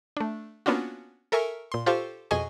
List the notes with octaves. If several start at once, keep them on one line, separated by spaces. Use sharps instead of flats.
A3 D4
A#3 B3 C#4 D4 F4 F#4
A4 A#4 E5 G#5 C#6
A#2 C6
F4 G4 A4 C5 F5 C#6
F2 B2 G#4 D#5 G#5 C#6